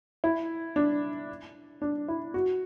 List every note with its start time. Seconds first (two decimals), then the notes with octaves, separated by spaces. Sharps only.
0.24 E4
0.76 D4
1.82 D4
2.08 E4
2.34 F#4